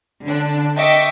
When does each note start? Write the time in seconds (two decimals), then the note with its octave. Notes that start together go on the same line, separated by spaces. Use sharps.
0.23 D3 D4
0.75 D#5 E5 G5 C#6 D6